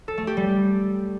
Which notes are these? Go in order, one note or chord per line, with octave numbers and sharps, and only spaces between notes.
A4
A3
G4
G3